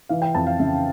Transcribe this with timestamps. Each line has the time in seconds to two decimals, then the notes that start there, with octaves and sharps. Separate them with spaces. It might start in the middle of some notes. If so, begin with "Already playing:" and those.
0.09 E3 F5
0.22 G5
0.35 F2 A5
0.47 F5
0.59 C#3 E5